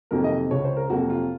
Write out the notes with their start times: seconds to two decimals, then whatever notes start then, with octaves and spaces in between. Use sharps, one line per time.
0.11 F2 C3 D#3 F#3 A#3 A#4
0.24 D#5
0.50 C#2 C#3 G#3 C#5
0.64 C5
0.77 A#4
0.90 F2 C3 F#3 A#3 F#4
1.10 F4